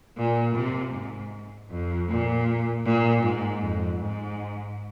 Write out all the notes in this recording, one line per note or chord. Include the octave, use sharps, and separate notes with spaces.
A#2
C3
G#2
F2
A#2
A#2
G#2
F2
G#2